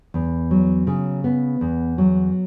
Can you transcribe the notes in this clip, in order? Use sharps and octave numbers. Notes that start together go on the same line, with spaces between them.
E2
F#3
C#3
B3
E2
F#3